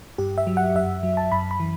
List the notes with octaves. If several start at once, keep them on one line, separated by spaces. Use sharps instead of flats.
G2 G4
E5
F#3
F#5
F#2 E5
F#3
A5
F#2 B5
B5
E3